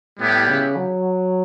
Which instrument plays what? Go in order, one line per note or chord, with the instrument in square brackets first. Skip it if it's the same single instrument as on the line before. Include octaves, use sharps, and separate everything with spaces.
[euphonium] A2 [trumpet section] G3 B3 E4 G4
[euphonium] C#3
F#3